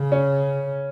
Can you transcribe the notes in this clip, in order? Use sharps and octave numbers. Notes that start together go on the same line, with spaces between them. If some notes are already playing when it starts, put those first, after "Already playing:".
Already playing: C#3
C#4